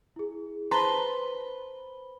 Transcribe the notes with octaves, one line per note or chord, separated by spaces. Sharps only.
E4 G#4
B4 C5 A5 A#5 C6 G7